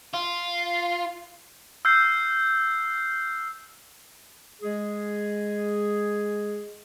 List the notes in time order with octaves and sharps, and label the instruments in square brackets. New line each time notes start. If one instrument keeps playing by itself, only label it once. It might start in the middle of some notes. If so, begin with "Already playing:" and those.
[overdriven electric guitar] F4
[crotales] E6 F6 G6 C7
[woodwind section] G#3 G#4